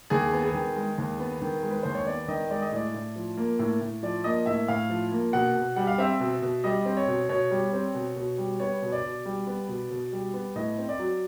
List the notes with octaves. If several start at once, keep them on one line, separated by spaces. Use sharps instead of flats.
D#2 G#4
B3
G#4
D#3
G#3
D#2
B3
D#3
G#3
B4
D#2 C5
C#5
B3 D5
D#3 D#5
G#3 D5
D#5
A2 D5
A2
F3
A#3
A2
A2
F3 D5
A#3 D#5
A2 E5
A2 F5
F3
A#3
B2 F#5
B2
G3 F#5
F5
C4 E5
B2
B2
G3 D#5
C4
C#5
B2
B2 C#5
G3
C4
B2
B2
G3
B3 C#5
B2
D5
B2
G3
B3
B2
B2
G3
B3
A2 D#5
C4
D5
F#3